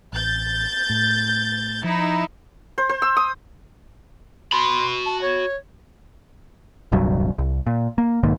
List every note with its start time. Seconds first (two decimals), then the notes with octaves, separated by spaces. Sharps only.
0.13 A1 G6 A6
0.90 A2
1.84 F3 D#4 E4
2.78 C5
2.89 C5
3.02 E6
3.17 D#6
4.53 F#4 B5 C6
5.05 A5
5.21 C#5
6.92 D#1 C2 G2 F#3
7.38 C2
7.67 A#2
7.98 A#3
8.23 B1 G#2 D#3 A#3